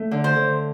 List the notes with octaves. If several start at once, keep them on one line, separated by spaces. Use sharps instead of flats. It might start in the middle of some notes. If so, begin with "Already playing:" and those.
Already playing: A3
D3
C5
D3